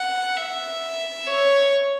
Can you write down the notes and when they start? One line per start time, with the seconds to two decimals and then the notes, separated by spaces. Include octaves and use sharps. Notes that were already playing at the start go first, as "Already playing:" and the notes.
Already playing: F#5
0.37 E5
1.26 C#5